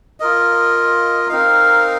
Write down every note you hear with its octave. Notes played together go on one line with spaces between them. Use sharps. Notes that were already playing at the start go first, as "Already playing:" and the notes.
F4 A#4 D#5
C4 D#4 A#4 F5